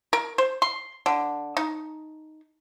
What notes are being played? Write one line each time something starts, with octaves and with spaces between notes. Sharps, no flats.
A#4
C5
C6
D3
D#4